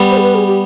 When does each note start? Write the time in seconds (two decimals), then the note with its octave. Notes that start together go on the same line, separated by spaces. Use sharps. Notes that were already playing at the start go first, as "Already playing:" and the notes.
Already playing: G3 B3
0.10 C5
0.18 G#4
0.22 B4
0.35 G#4
0.47 G4